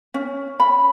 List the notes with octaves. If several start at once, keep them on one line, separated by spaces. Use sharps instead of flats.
C#4
B5